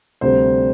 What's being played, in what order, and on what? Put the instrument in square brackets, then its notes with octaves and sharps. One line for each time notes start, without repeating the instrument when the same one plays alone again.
[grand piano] D2 C3 G3 C5